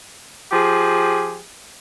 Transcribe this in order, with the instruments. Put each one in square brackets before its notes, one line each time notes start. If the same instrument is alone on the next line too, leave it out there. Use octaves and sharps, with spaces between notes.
[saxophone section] F3 G4 G#4